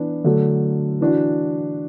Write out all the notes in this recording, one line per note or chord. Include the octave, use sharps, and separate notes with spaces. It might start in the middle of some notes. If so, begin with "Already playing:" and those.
Already playing: E3 B3 D4
D3 F#3 A3
E3 D4 F#4